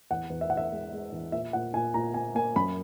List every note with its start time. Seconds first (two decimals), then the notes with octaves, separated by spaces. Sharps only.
0.10 E2 F#5
0.30 E2
0.41 E5
0.50 E2 F#5
0.57 E5
0.72 G#3
0.92 G#3
1.12 E2
1.32 A#2 E5
1.53 A#2 F#5
1.74 A#2 G#5
1.94 A#2 A#5
2.14 A#3 G#5
2.35 A#3 G#5
2.56 F#2 B5